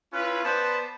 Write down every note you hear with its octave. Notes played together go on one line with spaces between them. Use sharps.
C#4 E4 F4 B4
B3 B4 C5 D5 A5